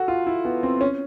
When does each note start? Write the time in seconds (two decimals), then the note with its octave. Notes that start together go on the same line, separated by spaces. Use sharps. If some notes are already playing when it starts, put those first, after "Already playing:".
Already playing: F#4 A4
0.08 F4
0.27 E4
0.45 B3
0.63 C4
0.81 C#4